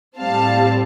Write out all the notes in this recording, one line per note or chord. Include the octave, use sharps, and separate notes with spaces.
A2 G3 C4 F5 A5